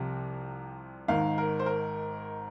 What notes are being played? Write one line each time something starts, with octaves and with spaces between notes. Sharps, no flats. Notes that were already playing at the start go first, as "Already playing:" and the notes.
Already playing: C2 C3 F3
G#1 G#2 D#3 F5
A#4
C5
A#4